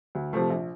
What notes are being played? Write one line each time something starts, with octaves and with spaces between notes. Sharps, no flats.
D2
C3 F3 A3
A#1